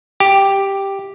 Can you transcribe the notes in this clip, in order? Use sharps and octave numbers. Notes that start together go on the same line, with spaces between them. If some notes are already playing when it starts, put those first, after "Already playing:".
G4